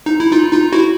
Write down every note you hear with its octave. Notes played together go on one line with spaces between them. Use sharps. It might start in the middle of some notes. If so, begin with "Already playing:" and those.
D#4
E4
D#4 F4
D#4 F4
E4 F#4